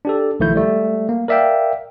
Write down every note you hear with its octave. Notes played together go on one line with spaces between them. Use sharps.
D4 G4 A4
B1 D#3 F3 A3 E4 G6
G3 A3
A#3
A#4 D5 E5 F5 G5